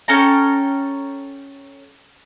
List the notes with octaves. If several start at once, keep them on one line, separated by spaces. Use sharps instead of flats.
C#4 A4 G5 A#5